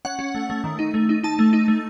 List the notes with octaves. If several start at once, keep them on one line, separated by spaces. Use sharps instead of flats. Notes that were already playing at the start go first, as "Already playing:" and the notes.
C#4 F#5
C#4
A3
A3
D#3
D#4
A3
D#4
D#4 A5
A3
D#4
A3